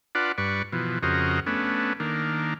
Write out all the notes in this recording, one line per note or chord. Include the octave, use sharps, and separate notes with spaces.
D4 F4 B4 D5 F#5
G2 B4 D5 C#6
B2 E3 F3
F2 C#3 F#4 A#4 C5 D#5
A3 B3 C#4 D4
D#3 A#3 D4